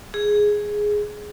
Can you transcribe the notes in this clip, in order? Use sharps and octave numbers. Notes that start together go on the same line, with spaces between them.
G#4